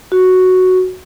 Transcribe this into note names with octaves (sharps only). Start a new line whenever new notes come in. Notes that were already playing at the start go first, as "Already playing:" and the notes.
F#4